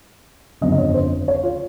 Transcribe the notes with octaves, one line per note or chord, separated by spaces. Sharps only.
G1 F2 C#3 D#5
D#5
C#5
C5
C#5
F4